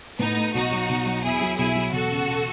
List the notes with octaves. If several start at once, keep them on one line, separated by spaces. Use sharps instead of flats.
A2 B3 D#4
A3
B1 D#4 F#4
F#3
B1
F#3
E2 E4 G#4
F#3
B1 E4 G#4
F#3
E1 F#4 A4
C#3
E1